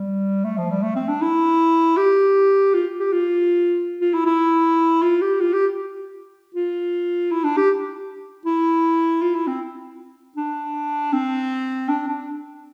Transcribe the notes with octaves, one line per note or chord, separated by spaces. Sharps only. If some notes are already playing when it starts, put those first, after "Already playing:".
Already playing: G3
A3
F3
G3
A3
C4
D4
E4
G4
F4
G4
F4
F4
E4
E4
F4
G4
F4
G4
F4
E4
D4
G4
E4
F4
E4
C4
D4
C4
D4
D4